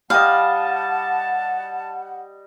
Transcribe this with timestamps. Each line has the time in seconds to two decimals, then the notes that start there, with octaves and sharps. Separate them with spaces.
0.10 G3 D#5 F5 F#5 A5